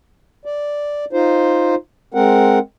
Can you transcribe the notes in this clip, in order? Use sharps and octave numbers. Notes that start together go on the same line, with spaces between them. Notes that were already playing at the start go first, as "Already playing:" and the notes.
D5
D#4 F4 C5
G#3 C4 A#4 F#5